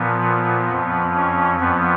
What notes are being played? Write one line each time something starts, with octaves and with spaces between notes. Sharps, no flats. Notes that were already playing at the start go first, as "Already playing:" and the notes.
Already playing: A#2 F3 B3
F2 F3
C#4
F2 F3 B3